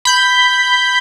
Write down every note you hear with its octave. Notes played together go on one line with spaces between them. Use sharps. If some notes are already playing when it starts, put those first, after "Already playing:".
B5 G6